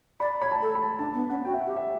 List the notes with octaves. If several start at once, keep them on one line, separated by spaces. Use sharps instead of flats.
D5 B5
C#5 B5
A5
A4
B5
A5
D4 A5
B3
C#4 F#5
F#4 G5
E5
F#5
G4
E5